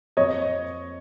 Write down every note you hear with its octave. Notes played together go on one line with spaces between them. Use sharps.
F2 C#5 D#5